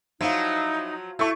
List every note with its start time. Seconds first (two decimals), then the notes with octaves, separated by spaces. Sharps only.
0.21 F3 F#3 D#4 E4 F5
1.19 A3 E4 A4 C#6